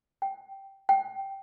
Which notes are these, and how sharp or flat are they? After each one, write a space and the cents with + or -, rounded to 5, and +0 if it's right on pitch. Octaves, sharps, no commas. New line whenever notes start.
G5 -10
G5 -10